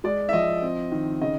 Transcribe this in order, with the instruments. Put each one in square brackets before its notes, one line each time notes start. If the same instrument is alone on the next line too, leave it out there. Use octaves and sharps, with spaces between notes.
[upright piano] G#3 D5
E5
F3 D#5
C4
D#3
C#3 D#5